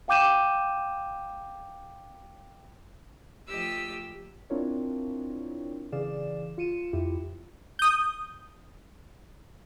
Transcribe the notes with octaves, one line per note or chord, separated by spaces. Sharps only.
F5 G5 D6 G6 D#7 E7
F3 A3 G4 D#5 E6
C4 D4 E4 F4 A#4 C#5
C#3 E3 G#4 D5 F5 E7
F4 C#7 D#7 E7
F2 E4 F4 G4
D#6 G6